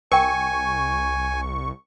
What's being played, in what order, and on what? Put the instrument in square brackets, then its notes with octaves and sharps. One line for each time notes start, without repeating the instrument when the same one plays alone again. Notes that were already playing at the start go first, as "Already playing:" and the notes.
[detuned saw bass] C2 [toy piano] A#4 G5 [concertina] G#5 [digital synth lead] C#6